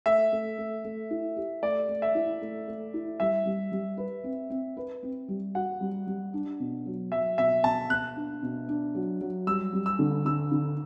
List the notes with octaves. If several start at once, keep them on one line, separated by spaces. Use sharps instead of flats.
A3 E5
A3
A3
A3
E4
G4
A3 D5
A3
E5
E4
A3
A3
E4
G3 E5
G3
G3
B4
C4
C4
B4
C4
G3
F#4 F#5
G3
G3
D4
B2
F#3
F#3 E5
B2 E5
B2 A5
B2 F#6
D4
B2
D4
F#3
F#3
G3 E6
G3
E6
D3
D3 E6
D3